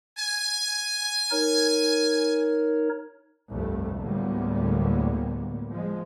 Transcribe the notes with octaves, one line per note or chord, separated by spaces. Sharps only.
G#5
D#4 A#4 C#5
F1 C2 G2 A3
D2 A2 G3 G#3 A#3 B3
F3 G#3